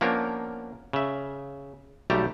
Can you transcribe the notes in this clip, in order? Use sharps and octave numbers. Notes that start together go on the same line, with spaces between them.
F3 A#3 B3 C#4 D4 A#4
C#3 E5
B1 G3 A3 G4 A5 A#5